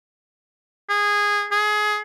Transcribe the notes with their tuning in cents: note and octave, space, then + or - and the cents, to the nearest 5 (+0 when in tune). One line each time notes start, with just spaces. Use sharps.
G#4 -15
G#4 +20